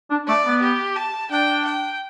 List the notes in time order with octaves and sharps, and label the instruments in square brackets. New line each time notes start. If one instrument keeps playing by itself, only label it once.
[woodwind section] D4
[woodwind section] A3 [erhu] D5
[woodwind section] B3
[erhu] G4
A5
[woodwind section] D4 [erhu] G5
[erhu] G5